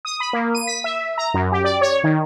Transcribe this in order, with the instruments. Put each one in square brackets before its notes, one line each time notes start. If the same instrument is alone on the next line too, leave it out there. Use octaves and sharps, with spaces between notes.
[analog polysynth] D#6
B5
A#3
D#7
B6
E5
A#5
F#2
G4
D5
C#5
D#3